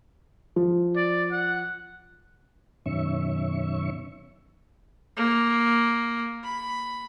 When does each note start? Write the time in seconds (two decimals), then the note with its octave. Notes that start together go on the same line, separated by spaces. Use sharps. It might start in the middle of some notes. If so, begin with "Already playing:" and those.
0.56 F3
0.96 D5
1.32 F#5
2.86 F#2 B2 D#3 C#4 E5 C#6
5.17 A#3
6.44 B5